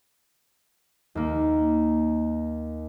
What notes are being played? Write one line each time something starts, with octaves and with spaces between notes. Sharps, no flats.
D#2 A#3